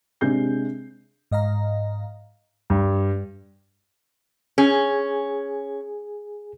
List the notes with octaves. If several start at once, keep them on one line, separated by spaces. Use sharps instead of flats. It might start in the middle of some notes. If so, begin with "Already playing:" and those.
C3 G#3 D4 G#4 G6 C7
G#2 D#5 F5 A#5
G2
C#4 G#4 G#5